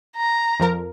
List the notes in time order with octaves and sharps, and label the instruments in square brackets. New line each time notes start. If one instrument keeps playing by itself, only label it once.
[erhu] A#5
[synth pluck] F2 F3 A#4